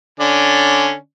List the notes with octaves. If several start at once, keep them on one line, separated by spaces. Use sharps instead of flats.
D3 C#4 D5